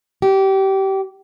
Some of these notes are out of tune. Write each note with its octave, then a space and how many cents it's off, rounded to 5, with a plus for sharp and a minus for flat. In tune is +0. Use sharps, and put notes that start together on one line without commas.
G4 -25